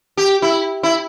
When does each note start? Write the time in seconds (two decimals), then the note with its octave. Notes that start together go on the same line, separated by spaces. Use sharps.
0.17 G4
0.42 E4
0.83 E4